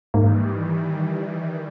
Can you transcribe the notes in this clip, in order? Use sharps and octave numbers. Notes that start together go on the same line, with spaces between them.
G#2 D#3 E3 G3 A#3